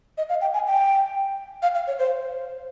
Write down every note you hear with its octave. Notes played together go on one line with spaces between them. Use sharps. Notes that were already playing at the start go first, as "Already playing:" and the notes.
D#5
F5
G5
G#5
G5
F5
F5
C#5
C5